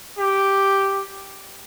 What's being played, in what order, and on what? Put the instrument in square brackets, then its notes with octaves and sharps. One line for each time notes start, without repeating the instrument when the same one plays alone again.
[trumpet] G4